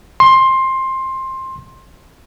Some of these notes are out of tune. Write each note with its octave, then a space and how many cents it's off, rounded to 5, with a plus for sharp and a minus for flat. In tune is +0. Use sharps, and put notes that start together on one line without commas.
C6 +15